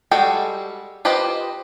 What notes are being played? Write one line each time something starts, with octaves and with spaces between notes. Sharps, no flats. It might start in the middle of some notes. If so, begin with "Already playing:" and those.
G3 G#3 F#4 A4 G5
F4 G4 B4 C5 D#5